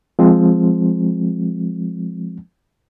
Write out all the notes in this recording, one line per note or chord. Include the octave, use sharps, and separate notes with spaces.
F3 G#3 C4